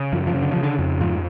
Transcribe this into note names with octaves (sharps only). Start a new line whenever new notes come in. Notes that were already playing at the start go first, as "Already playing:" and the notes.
Already playing: C#3
F#2 F3
F3
C#3
D3
C#3 F3
D3
F2
G#2 F3